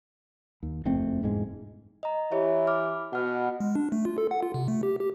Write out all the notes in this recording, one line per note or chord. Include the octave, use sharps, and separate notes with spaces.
D#2
F#1 F2 A3 C4
E1 G#2 G#3
D#5 A#5
E3 G4 C#5 E5
D6 F6
B2 F#5 F6
G#3
D4
A3
F4
A4
F#5
F4
C3
A3
G4
G4